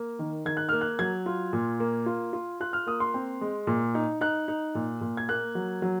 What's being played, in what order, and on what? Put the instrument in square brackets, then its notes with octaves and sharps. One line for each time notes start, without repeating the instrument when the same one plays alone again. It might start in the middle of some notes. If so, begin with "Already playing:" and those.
Already playing: [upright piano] A#3
D#3
D#3 G#6
F#6
A#3 F6
F#6
F#3 G#6
F4
A#2
A#3
F4
F4
F4 F#6
F6
A#3 D#6
C6
C4
G#3
A#2
D#4
D#4 F#6
D#4
A#2
A#2
G#6
A#3 F#6
F#3
F#3